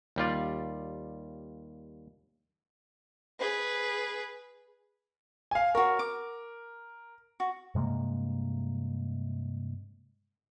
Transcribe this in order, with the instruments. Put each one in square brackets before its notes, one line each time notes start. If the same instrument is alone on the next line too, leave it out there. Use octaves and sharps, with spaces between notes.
[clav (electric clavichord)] D#2 G3 F4 D5
[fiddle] G#4 B4
[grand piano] F5 G#5
[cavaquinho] F#4 C#5 [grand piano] A#4
[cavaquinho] D6
F#4
[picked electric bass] G2 C3 G#3 A#3